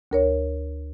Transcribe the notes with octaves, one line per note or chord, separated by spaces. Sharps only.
D2 A#4 C#5